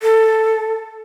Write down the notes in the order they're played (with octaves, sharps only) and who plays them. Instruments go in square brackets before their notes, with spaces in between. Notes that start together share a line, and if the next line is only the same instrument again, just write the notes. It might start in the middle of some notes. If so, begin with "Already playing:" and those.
[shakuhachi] A4